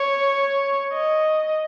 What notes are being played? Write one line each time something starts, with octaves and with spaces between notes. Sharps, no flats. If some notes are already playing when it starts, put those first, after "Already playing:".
Already playing: C#5
D#5